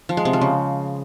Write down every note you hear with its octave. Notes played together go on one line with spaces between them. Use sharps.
F3
G#3
C3
F3
C#3